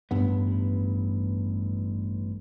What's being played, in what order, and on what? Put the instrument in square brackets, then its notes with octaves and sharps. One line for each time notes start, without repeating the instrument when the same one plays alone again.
[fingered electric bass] A1 G2 B3